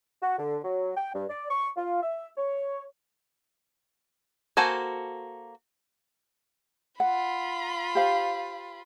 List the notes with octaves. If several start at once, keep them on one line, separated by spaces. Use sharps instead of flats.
F#4
D3
F#3
G5
G2
D5
C#6
F4
E5
C#5
A#3 F#4 A4 C5 G#5
F4 F#5 B5
G4 C5 F5